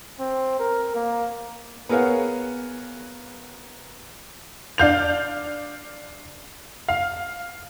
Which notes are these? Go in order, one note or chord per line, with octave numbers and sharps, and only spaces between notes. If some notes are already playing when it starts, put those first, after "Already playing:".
C4
A#4
A#3
B3 G#4 A#4 C#5 F5 F#5
D4 F5 G6 F7
F5